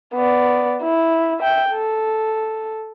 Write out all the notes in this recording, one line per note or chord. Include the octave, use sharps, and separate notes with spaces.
B3 D5
E4
E5 G5
A4